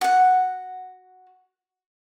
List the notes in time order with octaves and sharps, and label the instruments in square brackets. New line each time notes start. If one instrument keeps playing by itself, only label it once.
[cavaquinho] F#4 F#5